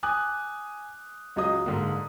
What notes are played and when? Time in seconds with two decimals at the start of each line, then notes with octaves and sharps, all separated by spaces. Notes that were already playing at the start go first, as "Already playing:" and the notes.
0.03 G#5 D6 D#6 F#6
1.36 C#2 F#3 D#5 D#6
1.66 G#2 D3 A#3